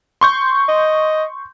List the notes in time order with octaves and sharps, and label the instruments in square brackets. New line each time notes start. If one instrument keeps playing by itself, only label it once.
[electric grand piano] C6 C#6 G6
[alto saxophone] D#5